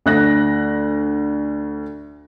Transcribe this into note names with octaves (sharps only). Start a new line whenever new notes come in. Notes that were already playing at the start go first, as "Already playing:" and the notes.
D2 F#6 A#6